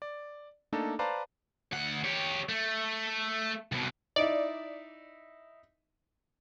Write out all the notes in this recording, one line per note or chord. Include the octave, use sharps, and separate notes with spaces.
D5
A3 A#3 D4 D#4 A4
B4 C5 D5 F5 A5 A#5
D2 F#5
G4 C#5
A3
C2 B2
D#4 E4 D5